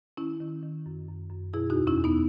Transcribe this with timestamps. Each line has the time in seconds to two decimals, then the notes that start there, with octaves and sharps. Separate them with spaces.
0.17 D#3 C#4 E4
0.40 D#3
0.63 D#3
0.86 F#2
1.08 F#2
1.30 F#2
1.53 B2 E4 G#4
1.70 D#4 F#4
1.76 E2
1.87 C#4 E4
1.98 E2
2.04 B3 D#4